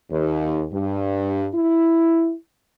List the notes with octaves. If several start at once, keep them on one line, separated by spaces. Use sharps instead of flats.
D#2
G2
E4